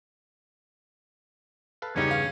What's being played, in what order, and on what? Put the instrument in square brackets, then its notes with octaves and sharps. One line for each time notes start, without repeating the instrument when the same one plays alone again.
[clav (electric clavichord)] A4 B4 F5
[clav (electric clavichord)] E2 G2 C#3 [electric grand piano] B3 D#4 G4 [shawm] C#4
[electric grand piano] F5